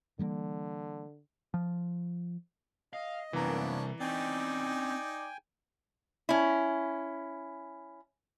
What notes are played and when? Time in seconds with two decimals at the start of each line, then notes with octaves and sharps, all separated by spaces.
0.19 D3 E3 G3 A#3
1.54 F3
2.93 D#5 F5
3.33 C2 F#2 E3 A#3 B3 C#4 D4 A#5
4.00 C4 C#4 D#4 D5 G5 G#5
6.29 C#4 E4